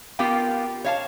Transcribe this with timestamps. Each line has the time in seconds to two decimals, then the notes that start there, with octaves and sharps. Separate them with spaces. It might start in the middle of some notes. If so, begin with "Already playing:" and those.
0.19 B3 F4 G4 A#4 F5 G5
0.84 C#5 F5 A5